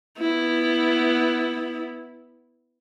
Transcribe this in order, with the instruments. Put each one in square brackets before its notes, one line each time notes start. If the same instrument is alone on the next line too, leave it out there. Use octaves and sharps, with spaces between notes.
[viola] B3 E4